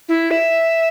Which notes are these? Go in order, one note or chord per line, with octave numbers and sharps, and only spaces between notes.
E4
E5